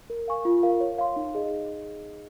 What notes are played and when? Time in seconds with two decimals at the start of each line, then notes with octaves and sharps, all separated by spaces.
0.10 A#4
0.28 F5 G#5 C#6
0.45 F4
0.63 A#4 F5
0.80 C#5
0.99 F5 C6
1.16 D#4
1.35 G#4 D#5